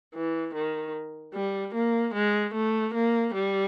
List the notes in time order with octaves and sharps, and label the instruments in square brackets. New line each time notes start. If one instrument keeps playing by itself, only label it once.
[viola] E3
D#3
G3
A#3
G#3
A3
A#3
G3